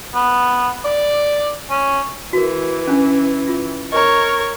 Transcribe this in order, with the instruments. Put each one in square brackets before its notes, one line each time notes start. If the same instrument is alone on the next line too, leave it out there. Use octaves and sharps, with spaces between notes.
[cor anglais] B3
D5
C#4
[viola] E3 [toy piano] F#4 A#4
[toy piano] C#4 D4
F4
[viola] A#4 C#5 [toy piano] D#5 A#5